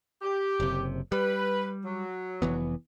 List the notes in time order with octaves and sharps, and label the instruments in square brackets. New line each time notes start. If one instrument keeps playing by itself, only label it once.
[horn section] G4
[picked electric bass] F#1 C3
[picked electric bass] G3 [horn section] B4
[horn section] F#3
[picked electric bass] F1 E3 B3